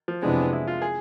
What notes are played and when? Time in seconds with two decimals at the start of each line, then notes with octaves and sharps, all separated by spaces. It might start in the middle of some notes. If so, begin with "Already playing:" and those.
0.08 F3
0.22 F2 C3 E3 G#3 B3 D4
0.53 E4
0.68 F4
0.82 G#4